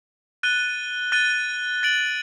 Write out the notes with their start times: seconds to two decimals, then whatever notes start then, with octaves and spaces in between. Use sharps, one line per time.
0.43 F#6 A6 D#7 G7
1.12 F#6 A6 D#7 G7
1.83 A6 D7 F#7